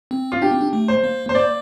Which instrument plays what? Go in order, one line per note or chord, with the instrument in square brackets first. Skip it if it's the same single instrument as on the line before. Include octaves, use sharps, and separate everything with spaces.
[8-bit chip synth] C4
[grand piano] F4
[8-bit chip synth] D4 [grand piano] G4
[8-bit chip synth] C4
D4
A3
[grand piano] C5
[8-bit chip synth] A#3
[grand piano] C5
[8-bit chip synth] A#3 [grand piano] D5